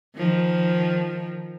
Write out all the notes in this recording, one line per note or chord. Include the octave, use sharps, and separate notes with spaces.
D#3 F3